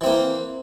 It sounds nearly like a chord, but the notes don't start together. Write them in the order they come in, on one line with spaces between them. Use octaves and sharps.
E3 C4 A#3